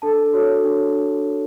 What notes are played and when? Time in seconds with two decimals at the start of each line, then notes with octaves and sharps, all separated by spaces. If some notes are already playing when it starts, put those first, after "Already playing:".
0.02 D4 A4 A5
0.33 F#4 A4 C#5
0.64 D4